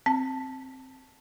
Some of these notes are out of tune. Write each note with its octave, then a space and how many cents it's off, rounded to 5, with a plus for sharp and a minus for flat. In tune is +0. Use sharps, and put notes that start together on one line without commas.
C4 +5 A5 +0